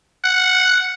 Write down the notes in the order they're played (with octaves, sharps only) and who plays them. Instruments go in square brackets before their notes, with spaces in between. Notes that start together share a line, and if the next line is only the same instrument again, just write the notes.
[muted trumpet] F#5